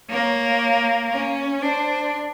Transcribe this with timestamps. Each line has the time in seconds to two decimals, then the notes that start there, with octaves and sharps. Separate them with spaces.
0.10 A#3 C#5
1.12 C#4 C#5
1.62 D4 C5